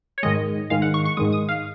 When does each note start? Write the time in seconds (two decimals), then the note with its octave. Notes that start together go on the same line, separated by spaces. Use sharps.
0.18 C#5
0.23 G#2 D#3 G#3 D#5
0.70 G#2 D#3 G#3 F5
0.82 F#5
0.94 C#6
1.05 C#6
1.17 G#2 D#3 G#3 D#6
1.32 D#6
1.49 F5